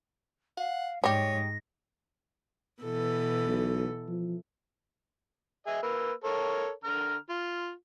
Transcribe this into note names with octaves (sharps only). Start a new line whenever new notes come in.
F5 F#5
G#2 G3 G#3 G4 C#5 A#6
B2 E3 A4
B1
F3
G#4 D#5 E5
A#3 B4 E6
A4 A#4 C#5
D3 A#5 F6
F4